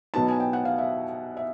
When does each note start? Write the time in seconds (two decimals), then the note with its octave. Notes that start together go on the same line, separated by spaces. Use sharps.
0.14 B2 F#3 B3 D#4 A5
0.28 G#5
0.40 G5
0.53 F#5
0.65 F5
0.78 E5
1.37 E5